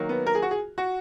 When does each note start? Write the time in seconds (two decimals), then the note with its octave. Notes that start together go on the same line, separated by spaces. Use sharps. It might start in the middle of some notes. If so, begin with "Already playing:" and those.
Already playing: D#3 F#3 A#3
0.09 B3
0.27 A#4
0.35 G#4
0.42 F#4
0.51 G#4
0.78 F#4